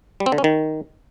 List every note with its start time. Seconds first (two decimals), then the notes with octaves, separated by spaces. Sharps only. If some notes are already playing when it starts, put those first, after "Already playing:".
0.20 G3
0.26 C4
0.32 D3
0.38 C#4
0.44 D#3